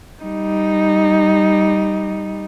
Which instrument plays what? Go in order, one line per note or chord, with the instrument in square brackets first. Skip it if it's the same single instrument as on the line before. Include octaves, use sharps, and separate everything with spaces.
[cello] G3 D#4